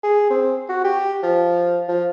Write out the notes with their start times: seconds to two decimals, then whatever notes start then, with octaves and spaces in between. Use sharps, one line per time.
0.03 G#4
0.30 C4
0.69 F#4
0.84 G4
1.23 F3
1.89 F3